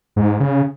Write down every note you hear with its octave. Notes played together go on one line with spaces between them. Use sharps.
G#2
C#3